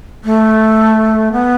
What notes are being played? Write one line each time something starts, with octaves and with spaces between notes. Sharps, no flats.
A3
B3